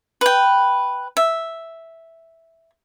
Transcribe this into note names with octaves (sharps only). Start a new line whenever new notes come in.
B4 G5
E5